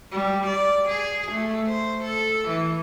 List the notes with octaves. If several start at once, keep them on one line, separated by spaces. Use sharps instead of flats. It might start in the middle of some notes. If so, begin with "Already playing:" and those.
G3
D5
G#4
A3
C5
A4
E3